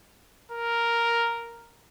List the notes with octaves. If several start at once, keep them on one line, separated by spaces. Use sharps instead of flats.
A#4